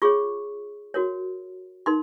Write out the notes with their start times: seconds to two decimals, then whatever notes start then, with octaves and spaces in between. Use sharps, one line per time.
0.02 F4 G#4 C#5 C#6
0.94 F#4 A#4 C#5
1.86 D#4 A#4 C6